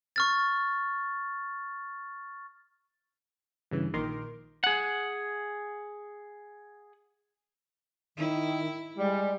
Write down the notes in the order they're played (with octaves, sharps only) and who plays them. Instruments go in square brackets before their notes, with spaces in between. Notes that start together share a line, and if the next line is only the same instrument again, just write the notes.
[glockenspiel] C#6 F6 A6
[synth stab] G2 C#3 E3
A#1 D#3 A#4 C6 D6
[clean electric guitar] G#4 F#5
[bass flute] D#3 [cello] E4
[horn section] G3 [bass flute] G#3